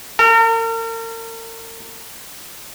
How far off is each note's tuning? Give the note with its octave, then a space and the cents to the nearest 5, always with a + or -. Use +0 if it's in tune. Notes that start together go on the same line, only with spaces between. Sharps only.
A#4 -40